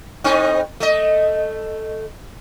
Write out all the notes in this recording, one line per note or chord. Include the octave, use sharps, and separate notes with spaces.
A2 C4 D#4
A3 D#5